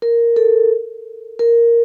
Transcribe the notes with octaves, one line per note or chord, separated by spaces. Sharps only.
A#4
A4
A#4